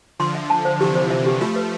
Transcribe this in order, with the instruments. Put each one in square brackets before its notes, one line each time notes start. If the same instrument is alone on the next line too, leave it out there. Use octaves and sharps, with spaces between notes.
[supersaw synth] D3 F3 [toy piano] C6
[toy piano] E5
A5
C5
[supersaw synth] C3 E3 [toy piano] G4
[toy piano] C5
E5
G4
[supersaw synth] F3 A3 [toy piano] F4
[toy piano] B4